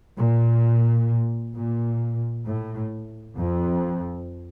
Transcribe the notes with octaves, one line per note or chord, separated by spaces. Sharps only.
A#2
A#2
A2
F2